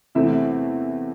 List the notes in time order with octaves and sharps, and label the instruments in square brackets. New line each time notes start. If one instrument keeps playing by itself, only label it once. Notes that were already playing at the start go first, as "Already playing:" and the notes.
[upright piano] E2 C3 E3 A3 C4 E5